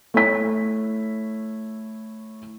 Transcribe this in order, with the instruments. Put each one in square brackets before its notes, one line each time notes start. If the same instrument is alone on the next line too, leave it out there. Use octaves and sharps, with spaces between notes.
[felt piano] A3 E4 C#5 B6